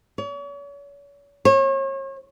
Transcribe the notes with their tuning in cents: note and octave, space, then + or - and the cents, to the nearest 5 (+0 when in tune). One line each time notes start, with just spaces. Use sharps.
C#5 +40
C#5 -40